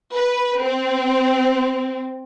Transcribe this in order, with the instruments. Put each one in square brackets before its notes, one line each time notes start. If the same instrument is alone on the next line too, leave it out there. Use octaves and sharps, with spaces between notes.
[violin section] B4
C4